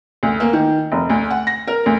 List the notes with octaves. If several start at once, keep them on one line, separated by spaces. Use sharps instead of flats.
D2
A#3
D#3
F1
D2
F#5
A#6
A#4
D2